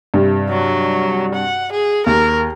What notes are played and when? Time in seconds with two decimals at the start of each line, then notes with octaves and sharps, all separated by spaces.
0.14 G2 C3
0.49 F#3
1.35 F#5
1.73 G#4
2.06 D#2 A#4